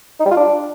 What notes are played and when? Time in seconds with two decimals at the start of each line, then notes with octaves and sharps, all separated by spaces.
0.20 D#4
0.25 G3
0.31 F4
0.37 D4